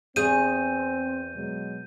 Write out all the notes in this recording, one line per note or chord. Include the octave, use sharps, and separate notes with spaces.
E2 C4 G#4 G6 D#7
B2 F#3 G#3